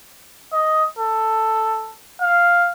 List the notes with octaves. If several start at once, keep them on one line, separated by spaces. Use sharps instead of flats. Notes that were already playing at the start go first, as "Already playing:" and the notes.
D#5
A4
F5